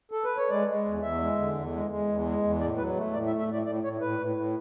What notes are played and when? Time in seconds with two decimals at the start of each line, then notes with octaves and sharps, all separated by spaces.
0.12 A4
0.24 B4
0.37 C#5
0.50 G#3 D5
0.67 G#3
0.86 E2
1.02 E2 E5
1.21 G#3
1.38 D3
1.55 E2
1.73 G#3
1.90 G#3
2.08 E2
2.26 G#3
2.43 E2
2.61 A2 D5
2.78 F#3 B4
2.96 A3
3.13 A2 D5
3.27 E5
3.30 A3
3.39 E5
3.48 A2 D5
3.66 A2 D5
3.83 A2 C#5
4.01 A2 B4
4.19 A2
4.36 A2